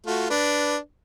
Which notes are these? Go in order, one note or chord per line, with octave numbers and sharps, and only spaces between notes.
A3 F4 F#4
D4 B4